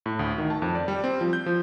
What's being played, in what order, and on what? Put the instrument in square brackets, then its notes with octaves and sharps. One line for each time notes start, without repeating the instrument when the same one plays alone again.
[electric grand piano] A2
D2
D#3
A5
F2
D5
G3
C4
F3
G6
F3